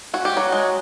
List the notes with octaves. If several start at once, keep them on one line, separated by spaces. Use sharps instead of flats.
C#4 F#4
G4
F#3 C#4 F#4
G#3